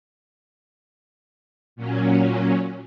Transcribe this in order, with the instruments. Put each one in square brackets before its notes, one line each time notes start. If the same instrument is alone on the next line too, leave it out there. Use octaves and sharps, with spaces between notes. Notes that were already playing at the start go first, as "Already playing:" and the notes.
[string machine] A#2 F#3 C#4